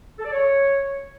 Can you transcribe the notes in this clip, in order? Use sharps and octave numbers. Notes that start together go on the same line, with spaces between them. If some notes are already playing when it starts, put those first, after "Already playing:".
A4
D5
C#5